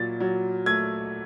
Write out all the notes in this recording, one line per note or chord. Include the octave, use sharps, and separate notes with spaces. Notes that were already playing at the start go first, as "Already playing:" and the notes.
Already playing: A#2 F#3 A6
F#3
A3 G#6